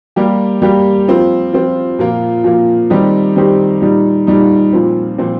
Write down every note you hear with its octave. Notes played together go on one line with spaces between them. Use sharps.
G3 A#3 G4
G3 A#3 G4
F3 C4 F4
F3 C4 F4
A#2 F3 A#3 F4
A#2 F3 A#3 F4
D#3 G3 C4 D#4 G4
D#3 G3 C4 D#4 G4
A#2 G3 D#4
A#2 G3 D#4
A#2 F3 C4
A#2 F3 C4